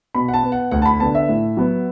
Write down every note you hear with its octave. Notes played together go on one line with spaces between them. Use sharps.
B2 B5
F#5
A5
B3
F#5
D2 F#5
A5
B5
D3 B3 A5
E5
A2
F#3 B3